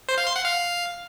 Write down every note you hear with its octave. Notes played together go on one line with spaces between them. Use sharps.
C5
F5
C6
F#5
F5